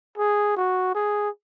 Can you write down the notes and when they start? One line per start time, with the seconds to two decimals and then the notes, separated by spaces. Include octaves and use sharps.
0.18 G#4
0.56 F#4
0.95 G#4